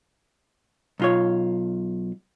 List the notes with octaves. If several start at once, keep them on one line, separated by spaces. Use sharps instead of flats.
B1 F4 C#5